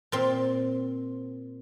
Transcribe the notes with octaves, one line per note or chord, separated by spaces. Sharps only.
A#2 C4